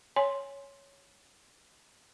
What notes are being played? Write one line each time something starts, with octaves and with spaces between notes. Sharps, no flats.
C#5 G#5 C6